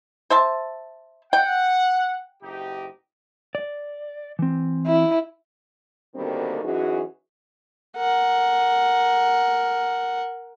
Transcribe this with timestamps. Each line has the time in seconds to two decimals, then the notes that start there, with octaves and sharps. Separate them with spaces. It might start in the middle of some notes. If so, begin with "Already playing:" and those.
0.30 C5 E5 A5
1.33 F#5 G5
2.42 F#1 D#4 G4
3.55 D5
4.39 E3 C4
4.86 E4
6.15 B2 D3 D#3 G3 A#3 C4
6.64 F#2 E3 C#4 D#4 F#4 G#4
7.98 A#4 F#5